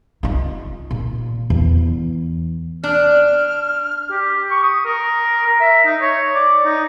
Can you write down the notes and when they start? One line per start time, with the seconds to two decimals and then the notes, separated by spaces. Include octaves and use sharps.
0.23 D#4 F4
0.91 A#2
1.50 E2
2.84 D4 F6
4.11 G4
4.51 C#6
4.63 D#6
4.85 A#4
5.46 A#5
5.61 E5
5.86 D#4
6.02 C#5
6.35 D5
6.65 D#4